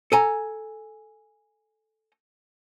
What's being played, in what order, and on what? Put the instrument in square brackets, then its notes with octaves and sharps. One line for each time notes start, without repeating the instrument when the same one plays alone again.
[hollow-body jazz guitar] A4 G#5 A#5